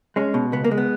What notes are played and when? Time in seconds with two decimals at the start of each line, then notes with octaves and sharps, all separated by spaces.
0.16 G#3 C#4
0.34 B2
0.52 C#2 B3
0.64 A#3
0.71 G#3
0.78 B3